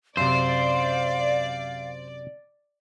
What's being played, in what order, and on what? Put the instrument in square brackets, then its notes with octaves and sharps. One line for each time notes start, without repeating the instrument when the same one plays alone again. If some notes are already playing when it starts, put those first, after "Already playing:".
[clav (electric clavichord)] F#2 C3 [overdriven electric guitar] C5 [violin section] D5 [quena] F5